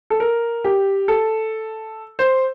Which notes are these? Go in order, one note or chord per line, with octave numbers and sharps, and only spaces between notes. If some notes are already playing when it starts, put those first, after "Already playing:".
A4
A#4
G4
A4
C5